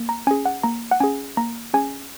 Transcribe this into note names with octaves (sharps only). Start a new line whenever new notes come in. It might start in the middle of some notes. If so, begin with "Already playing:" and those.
Already playing: A#3
A#5
C#4 G#4 G#5
F#5
A#3 A#5
F#5
C#4 G#4 G#5
A#3 A#5
C#4 G#4 G#5